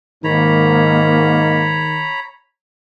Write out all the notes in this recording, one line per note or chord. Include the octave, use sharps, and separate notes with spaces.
G#2 D#3 A#3 C#5 A#5 B5